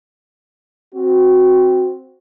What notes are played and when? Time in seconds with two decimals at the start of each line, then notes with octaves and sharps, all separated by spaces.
0.95 C4 F#4